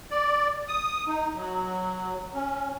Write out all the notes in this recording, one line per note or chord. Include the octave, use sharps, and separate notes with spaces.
D5
D#6
D#4
F#3
C#4